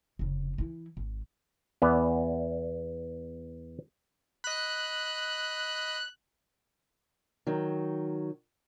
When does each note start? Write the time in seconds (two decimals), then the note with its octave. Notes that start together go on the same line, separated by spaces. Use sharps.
0.19 F1 C#3
0.58 E3 E4
0.97 G#1
1.82 E2 B3 D5
4.44 D#5 B5 F#6
7.47 D#3 F#3